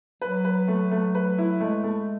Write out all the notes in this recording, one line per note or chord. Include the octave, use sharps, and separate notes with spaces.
F#3 B4
B4
A3
A3
B4
E4
G#3 A3
A3